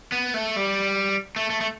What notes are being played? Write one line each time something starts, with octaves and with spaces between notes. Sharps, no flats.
B3
A3
G3
A3
A3
A3